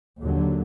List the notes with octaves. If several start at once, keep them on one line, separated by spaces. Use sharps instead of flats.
D#2 D3 F#3